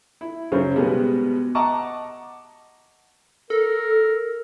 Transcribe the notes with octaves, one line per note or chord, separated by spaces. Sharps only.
E4
F#2 C#3 C5
B2 G3 G#3 B3
D#5 F#5 A5 A#5 C#6 D6
A4 A#4